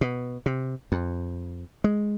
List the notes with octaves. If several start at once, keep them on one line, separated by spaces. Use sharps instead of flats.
B2
C3
F2
G#3